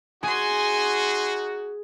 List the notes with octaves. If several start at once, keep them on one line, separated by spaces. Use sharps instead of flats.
D#4 F#4 G#4 G#5 C6